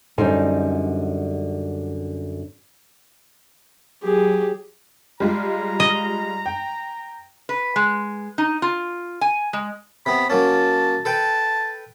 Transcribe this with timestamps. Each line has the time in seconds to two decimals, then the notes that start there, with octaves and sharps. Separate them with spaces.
0.18 F#2 D3 G3 D#4 C5 G#5
4.03 F#3 G4 G#4
5.20 G3 G#3 F4 A#5
5.80 D#5
6.46 G5
7.49 B4
7.76 G#3
8.38 D#4
8.62 F4
9.21 G#5
9.53 G#3
10.06 C3 B3 B5
10.30 F#3 A#3 C#4 A5
11.05 A4 B4 G5 A5